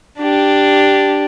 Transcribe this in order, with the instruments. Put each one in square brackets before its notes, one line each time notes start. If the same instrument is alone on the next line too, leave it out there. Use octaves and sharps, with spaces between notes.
[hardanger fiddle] D4 G4